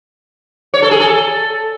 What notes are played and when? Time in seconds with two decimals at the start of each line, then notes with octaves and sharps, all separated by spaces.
0.74 C#5
0.82 A4
0.91 G#4
1.00 A4